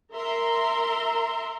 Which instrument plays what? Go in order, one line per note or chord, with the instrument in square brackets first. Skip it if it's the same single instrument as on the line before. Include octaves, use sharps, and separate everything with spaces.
[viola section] A#4 E5 A#5 C6